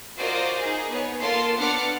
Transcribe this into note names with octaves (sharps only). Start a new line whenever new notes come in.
F4 F#4 A#4 C5 D5 D#5
D#4 G#4
B3 C#5
A#3 F4 A4 A#4 C6
B3 D4 F#5 D6 F6 C#7